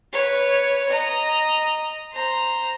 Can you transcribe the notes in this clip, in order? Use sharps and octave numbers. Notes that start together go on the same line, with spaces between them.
B4 C#5
D#5 A#5
C5 A#5